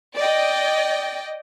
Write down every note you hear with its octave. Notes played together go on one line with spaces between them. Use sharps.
D5 D#5 G5